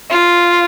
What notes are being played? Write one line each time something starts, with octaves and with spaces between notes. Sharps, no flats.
F4